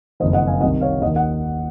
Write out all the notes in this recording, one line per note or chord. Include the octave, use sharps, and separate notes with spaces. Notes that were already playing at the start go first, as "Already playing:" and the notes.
F#1 F2 D#3 C5 D#5
D#5 F#5
F5 G#5
C2 C3 D#3 D#5 F#5
C#5 F5
D#2 D#5 F#5
D#3
D#5 F#5